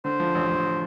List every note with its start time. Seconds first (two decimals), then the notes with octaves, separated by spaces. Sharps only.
0.04 D3 C5
0.20 F3
0.35 A1
0.50 A1